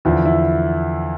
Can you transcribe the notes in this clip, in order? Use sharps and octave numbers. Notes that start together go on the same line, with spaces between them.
E2 D3 F3 E4
E4